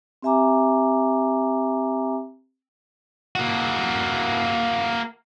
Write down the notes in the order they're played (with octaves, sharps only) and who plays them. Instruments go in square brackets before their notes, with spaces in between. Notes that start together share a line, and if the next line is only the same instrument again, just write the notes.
[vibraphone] C4 G4 E5 G#5 A#5 D6
[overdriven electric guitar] A#3 F#4